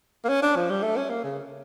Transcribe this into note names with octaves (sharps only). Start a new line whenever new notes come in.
A#3
C#4
D4
F3
G3
A3
C#4
A#3
C#3